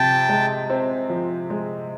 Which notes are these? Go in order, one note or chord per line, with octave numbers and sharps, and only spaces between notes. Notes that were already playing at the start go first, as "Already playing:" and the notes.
Already playing: C3 F3 G5 A5
G#3
C4
F3
G#3